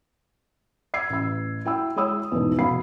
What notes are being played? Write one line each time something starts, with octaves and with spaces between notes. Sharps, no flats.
E6 G#6 C7
A1 E6
E4 G5 E6
G#3 E4 C#5 D#6 E6
E2 G#2 B2
F1 B2 B3 F5 B5 C7